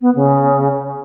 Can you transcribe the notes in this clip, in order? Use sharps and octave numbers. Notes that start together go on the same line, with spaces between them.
B3
C#3